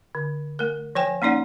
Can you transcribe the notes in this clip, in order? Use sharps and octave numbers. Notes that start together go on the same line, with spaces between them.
D3
A3 A#4
F3 C5 G5 G#5
A#3 C#4 D#4 D5 F#5